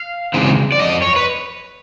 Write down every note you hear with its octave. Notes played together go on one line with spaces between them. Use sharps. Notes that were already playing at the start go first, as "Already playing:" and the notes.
Already playing: F5
C#3 E3 G#3 C4
D5
F2 D#5
C#5
B4